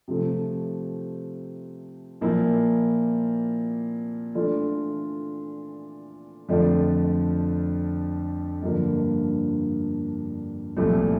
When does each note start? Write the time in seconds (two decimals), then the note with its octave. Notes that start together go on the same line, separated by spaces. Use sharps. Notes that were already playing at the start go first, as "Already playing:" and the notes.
0.08 C3 F3 A3 C4
2.21 A#2 F3 A#3 E4
4.35 E3 A3 D4 F4 A4
6.49 F2 D3 F3 A3 D4
8.62 G2 D3 F3 A#3
10.77 C2 A#2 F3 A3 E4